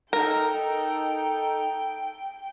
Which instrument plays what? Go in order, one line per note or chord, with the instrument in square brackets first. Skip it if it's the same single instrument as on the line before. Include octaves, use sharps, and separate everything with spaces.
[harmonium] D#4 A4 [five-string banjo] A#4 [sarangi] G5